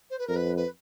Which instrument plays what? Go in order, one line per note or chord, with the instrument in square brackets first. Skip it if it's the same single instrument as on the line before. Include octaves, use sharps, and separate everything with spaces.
[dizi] C5
B4
[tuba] F2 [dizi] A#4
[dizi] B4
B4